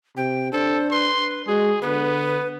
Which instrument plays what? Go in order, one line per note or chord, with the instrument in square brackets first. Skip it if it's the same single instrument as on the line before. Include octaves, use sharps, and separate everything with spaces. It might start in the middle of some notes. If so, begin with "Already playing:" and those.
[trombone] C3 [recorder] G5
[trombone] D4 [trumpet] A4 [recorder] C5
[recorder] B4 [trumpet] C6
[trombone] G#3 [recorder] F#4 [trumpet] G#4
[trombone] D3 [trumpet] B3 [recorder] B4